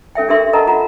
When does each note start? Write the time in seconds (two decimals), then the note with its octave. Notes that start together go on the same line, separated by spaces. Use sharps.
0.15 C#4 A4 E5 G5
0.28 D4 G4 A4 A#4 E5 C6
0.53 A4 A#4 D#5 F#5 A5 A#5
0.67 F4 F#5 A#5